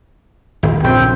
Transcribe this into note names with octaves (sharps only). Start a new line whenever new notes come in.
D#1 G#1
A#1 C#3 C4 G5